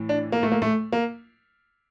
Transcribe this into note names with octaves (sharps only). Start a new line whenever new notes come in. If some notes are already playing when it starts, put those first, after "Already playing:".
Already playing: A2 E3
D4
A#3
A3
A#3
A3
A#3